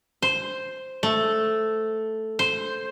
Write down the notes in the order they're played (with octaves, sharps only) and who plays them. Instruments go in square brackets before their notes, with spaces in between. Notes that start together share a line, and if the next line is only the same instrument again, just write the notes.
[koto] C5
A3
C5